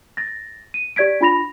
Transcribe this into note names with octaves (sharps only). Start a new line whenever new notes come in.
A6 A#6
D#7
G4 D5 G#6 B6 D7
D4 F4 B5 A#6 F7